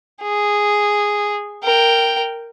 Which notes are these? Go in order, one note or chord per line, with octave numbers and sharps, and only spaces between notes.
G#4
A#4 G5